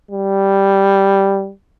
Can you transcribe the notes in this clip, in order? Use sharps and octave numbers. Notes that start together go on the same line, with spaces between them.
G3